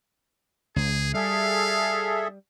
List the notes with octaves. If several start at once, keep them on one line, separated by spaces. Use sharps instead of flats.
C#2 G#4
G3 G#4 A4 E5 F5